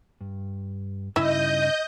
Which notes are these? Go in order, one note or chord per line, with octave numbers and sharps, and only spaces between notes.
G2
G2 C#3 D#4 E4 D#5 E5 G6